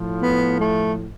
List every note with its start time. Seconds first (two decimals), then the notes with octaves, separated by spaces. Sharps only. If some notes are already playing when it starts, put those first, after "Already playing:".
Already playing: A2 F3
0.22 B3
0.60 A3